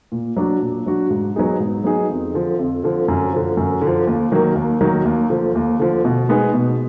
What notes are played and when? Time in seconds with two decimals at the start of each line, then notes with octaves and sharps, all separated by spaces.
0.12 A#2
0.37 F#3 D4 F#4
0.62 A#2
0.86 F#3 D4 F#4
1.10 G#2
1.36 F#3 B3 D#4 G#4
1.60 G#2
1.84 F#3 B3 D#4 G#4
2.10 F2
2.34 D3 F3
2.59 F2
2.84 D3 F3
3.08 F#2
3.32 D3 F3
3.57 F#2
3.81 D3
3.87 F3
4.07 D#2
4.32 D#3 F#3 A#3
4.55 D#2
4.81 D#3 F#3 A#3
5.05 D#2
5.30 D3 F3
5.55 D#2
5.79 D3 F3
6.05 B2
6.29 G#3 B3 D#4 G#4
6.53 B2